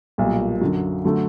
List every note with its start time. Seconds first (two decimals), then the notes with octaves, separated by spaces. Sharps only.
0.18 B1 A#2 G3
0.61 F#2 D3 F#3
1.04 D3 F#3 A3